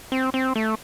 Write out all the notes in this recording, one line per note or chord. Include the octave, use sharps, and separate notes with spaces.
C4
C4
A3